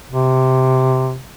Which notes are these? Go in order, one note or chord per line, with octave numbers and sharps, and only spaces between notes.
C3